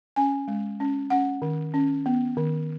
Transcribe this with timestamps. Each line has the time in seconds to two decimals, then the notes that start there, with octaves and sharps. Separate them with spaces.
0.16 C#4 G#5
0.48 G#3
0.80 C#4
1.10 C#4 F#5
1.42 D#3
1.74 C#4
2.06 B3
2.37 D#3